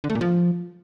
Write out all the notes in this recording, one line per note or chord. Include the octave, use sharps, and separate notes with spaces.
D3
A3
A#2
F3